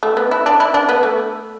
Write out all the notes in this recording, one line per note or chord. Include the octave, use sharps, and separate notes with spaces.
A3
B3
E4
D4
E4
D4
B3
A3